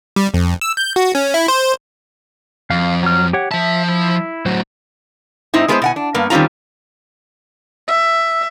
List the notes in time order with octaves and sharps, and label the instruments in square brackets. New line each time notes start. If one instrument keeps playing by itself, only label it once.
[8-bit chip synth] G3
F2
E6
G6
F#4
C#4
E4
C5
[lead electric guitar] F2 [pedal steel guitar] F5
[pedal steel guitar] F#3 F6
G4 C#5 F#5
[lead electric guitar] F3 A5 [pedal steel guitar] E5
[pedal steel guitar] E4
[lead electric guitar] A2 F#3 [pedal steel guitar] F#4 C5
[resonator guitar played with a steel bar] G#2 C4 D#4 E4
G#3 B3 F4 G#4 B4 C5
B2 F#5 G#5
D4
G2 A#3 B3
D#3 G3 C4 C#4 F4 A#5
[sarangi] E5